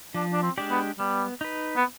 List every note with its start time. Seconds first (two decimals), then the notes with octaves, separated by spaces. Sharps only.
0.14 F3 D4
0.33 D4
0.43 C4
0.58 G#3 D4 G4 D5
0.71 B3
0.99 G3 B3
1.41 D#4 B4
1.76 B3